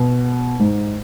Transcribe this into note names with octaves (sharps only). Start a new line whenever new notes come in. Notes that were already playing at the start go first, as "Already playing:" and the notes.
Already playing: B2
G#2